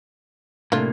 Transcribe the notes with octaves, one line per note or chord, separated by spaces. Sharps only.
A2 C3 A3 A#3 D4 F4